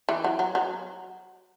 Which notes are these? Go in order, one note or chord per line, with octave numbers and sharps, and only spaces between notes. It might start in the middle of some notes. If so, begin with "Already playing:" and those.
E3
F#3
F#3
F#3